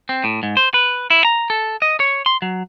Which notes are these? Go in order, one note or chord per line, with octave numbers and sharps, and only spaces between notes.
C4
A2
G#2
C5
B4
E4
A#5
A4
D#5
C#5
C6
F#3